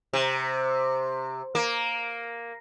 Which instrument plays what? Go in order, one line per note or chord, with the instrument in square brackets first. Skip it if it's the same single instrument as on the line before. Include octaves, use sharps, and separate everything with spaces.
[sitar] C3
A#3